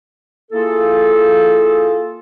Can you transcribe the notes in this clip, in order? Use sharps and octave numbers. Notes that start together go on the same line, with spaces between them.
A#3 E4 F4 G#4 A4